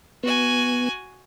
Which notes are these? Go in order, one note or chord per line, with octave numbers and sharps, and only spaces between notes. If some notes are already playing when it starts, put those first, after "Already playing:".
B3 F#4 G#5